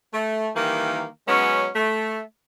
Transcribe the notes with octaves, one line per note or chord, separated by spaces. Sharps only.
A3
D#3 E3 G3 A#3
F#3 G#3 B3 C#4
A3